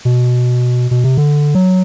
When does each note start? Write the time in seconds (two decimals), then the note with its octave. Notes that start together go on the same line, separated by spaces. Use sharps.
0.05 B2
0.91 B2
1.04 C3
1.17 D3
1.55 F#3